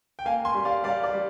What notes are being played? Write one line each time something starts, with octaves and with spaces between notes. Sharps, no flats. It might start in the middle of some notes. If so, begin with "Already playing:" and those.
G5
A#3 F5 G#5
G#5 C6
G3
D5 F5
G3 D5 F5
D5
G3